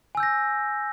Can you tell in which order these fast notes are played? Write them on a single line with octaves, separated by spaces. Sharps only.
G#5 E6 G6 A#6